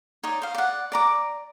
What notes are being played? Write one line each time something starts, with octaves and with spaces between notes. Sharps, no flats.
D#4 C#5 D5
C5 F5
D5 F#5
D5 A#5 D6